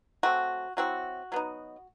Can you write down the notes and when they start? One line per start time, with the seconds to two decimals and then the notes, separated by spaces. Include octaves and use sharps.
0.23 F#3 A3 C4 F#4
0.77 F#3 C4 E4 F#4
1.32 F#3 B3 D#4